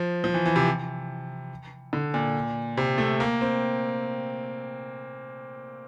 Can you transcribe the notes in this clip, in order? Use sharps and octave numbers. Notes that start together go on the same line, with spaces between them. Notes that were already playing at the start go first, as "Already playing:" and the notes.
Already playing: F3
F3
E3
E3
C3
D3
A#2
C3
A3
A#3
C4